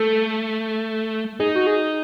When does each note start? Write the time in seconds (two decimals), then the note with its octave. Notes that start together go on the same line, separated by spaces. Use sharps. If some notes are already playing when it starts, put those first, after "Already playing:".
Already playing: A3 A4
1.40 D#4 G#4
1.55 F#4
1.67 G#4